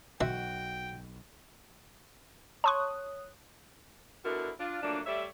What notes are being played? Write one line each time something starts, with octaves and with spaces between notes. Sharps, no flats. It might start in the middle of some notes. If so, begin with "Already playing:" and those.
B1 F#4 E5 G5 C6
C#5 A5 C6 C#6 D#6 F#6
B2 D3 D4 E4 F#4 A#4
D4 F4
F3 F#3 A3 A#3 D4
G3 A3 C#5 D5 E5